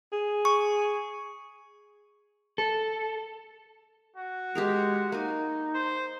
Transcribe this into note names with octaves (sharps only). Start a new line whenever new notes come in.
G#4
C#6
A4
F#4
G#3 G4 G#4 A#4
A#3 D#4 G#5
C5